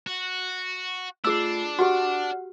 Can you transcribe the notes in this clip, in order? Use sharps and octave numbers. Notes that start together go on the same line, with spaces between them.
F#4
A3 D4 F4 G#4 E6 C7
F#4 G4 F#5 F6